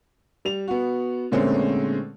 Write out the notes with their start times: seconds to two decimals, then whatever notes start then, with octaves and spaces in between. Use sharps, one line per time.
0.45 G3 F7
0.68 B3 F#4
1.32 A#2 D3 G#3 A3 C4 C#4